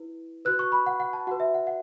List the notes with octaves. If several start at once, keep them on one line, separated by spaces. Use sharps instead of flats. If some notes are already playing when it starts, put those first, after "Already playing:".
Already playing: E4 B4
F#4 B4 F#6
C#6
B5
F#5
F#5
A5
F#4 B4 F#5
E5
F#5
F#5